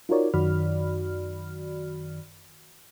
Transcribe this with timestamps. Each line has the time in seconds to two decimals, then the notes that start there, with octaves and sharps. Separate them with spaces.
0.09 D#4 F4 F#4 A#4 C#5 D5
0.34 F#2 D#3 F#4 D5 B5 F6